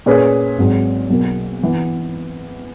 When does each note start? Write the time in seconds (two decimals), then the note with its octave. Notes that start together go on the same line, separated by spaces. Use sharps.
0.06 A#2 A#3 C#4 G#4 B4
0.57 G#1 G#2 F#3
1.10 B1 B2 A#3
1.63 E3 B3